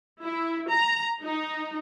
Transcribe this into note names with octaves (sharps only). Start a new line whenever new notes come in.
E4
A#5
D#4